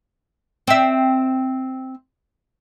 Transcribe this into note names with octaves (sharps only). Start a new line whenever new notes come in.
C4 E5